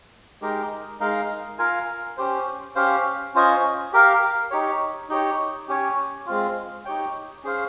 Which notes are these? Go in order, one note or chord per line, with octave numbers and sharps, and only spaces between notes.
G#3 D#4 G4 A#4
G#3 D#4 A#4 F5
F4 A#4 F5 G#5
C#4 G4 C5
C#4 G4 C5 F5
C#4 F4 C5 D#5 G#5
G4 A#4 F5
D#4 G4 C#5
D#4 G4 C#5
C#4 G4 C#5 G#5
G#3 C4 F4
D#4 G4 C#5 G5
C#4 G#4 C5 F5